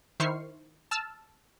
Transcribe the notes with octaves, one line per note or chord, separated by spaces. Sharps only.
D#3 E4 C5 C#6 F6 C7
A5 E6 F6